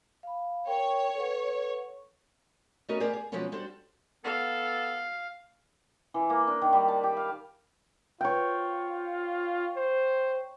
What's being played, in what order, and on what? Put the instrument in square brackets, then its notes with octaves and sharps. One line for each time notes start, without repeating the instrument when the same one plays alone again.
[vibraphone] F5 B5
[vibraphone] A#4 G5 [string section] C#5
[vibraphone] A4 B4 F#5
[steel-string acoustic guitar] A3 B3 C#4 F#4 A#4 D#5
G4 G#4 A#4 C5 D5 D#5
G#4
B2 F3 F#3 G#3 B3 C#4
G3 D4 F#4 A4 C5
[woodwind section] B3 A4 [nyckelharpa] F5
[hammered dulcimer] E3
A#3
D4
D#3
G3
A5
G4
F5
[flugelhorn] F4 [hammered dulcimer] C#5 G5
[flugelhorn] C5